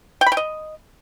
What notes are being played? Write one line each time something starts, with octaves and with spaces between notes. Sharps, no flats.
G5
B5
G5
D#5